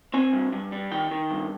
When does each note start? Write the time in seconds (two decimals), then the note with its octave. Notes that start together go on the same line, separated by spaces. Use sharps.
0.14 C4 G#5
0.33 G2
0.52 G2
0.72 G3
0.92 D#3 G5
1.11 D#3
1.31 G2